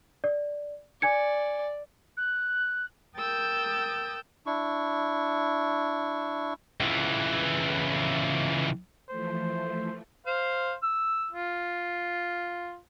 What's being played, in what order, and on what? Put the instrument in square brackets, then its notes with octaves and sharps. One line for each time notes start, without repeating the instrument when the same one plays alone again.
[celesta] D5
[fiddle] D5 [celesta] G#5 G#6 C#7
[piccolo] F#6
[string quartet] A#4 G5 D#6 E6 G6 A6
[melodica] D4 E4 C#6
[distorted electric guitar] C#2 E3
[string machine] E3 F3 A3 [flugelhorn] C5
[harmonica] C5 F5
E6
F4